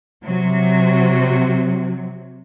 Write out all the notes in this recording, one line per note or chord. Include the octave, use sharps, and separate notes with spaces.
C3 F#3